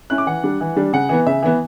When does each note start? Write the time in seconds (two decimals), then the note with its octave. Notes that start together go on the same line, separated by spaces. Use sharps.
0.10 C#4 E4 F#6
0.18 D6
0.26 E3 F#5
0.43 G3 D4
0.61 E3
0.77 G3 D4
0.93 C#3 F#5
1.09 E3 B3
1.26 C#3 E5
1.43 E3 B3